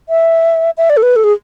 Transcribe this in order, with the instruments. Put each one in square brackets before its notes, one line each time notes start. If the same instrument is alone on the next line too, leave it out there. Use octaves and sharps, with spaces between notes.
[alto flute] E5
E5
D5
A4
B4
A4
G#4